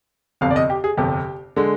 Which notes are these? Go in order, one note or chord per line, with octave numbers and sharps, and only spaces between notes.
G1 F2 C3 F5
D5
D#5
G4
G#4
G1 F2 C3 G4
D3 G#3